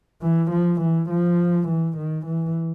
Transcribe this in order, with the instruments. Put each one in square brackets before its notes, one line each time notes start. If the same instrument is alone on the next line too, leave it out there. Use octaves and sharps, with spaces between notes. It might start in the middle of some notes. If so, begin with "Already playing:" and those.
[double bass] E3
F3
E3
F3
E3
D#3
E3